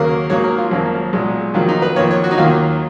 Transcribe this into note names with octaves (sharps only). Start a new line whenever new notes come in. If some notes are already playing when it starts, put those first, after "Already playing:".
Already playing: D#2 C#3 F#3 A#3 A#4
G#2 F#3 A#3 C#5
A#4
F4
G#1 F#2 F3 A#3
B1 A#2 G#3
F2 D#3 F#3 A#3 F4
D#4
B4
F2 D#3 A#3 C#5
C#5
F#4
D#4
D#2 D#3 F#3 A#3 F4